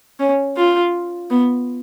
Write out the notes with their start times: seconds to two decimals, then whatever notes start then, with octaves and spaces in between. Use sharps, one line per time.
0.20 C#4
0.57 F4
1.30 B3